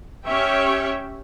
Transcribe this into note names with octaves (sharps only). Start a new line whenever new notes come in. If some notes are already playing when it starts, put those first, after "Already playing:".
C#4 G4 C#5 E5 G5